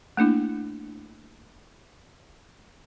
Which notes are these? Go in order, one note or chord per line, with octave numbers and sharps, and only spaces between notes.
A3 A#3 D4 E4